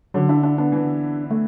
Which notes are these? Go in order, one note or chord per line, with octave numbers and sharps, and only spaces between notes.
D3 F#3
D4 E4
D4 E4
B3 D4
E3
A3